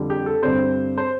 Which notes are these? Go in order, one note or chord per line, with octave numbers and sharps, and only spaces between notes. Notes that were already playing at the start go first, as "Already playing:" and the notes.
Already playing: F2 D3 G3 D4
G4
A4
G2 D3 G3 C4 D4 C5
C5